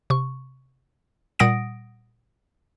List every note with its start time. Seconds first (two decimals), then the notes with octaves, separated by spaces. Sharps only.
0.10 C3 C#6
1.39 A#2 G3 F#5 D#6 A#6 D7